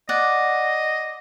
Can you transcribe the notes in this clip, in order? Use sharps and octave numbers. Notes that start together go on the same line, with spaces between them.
D5 D#5 F#5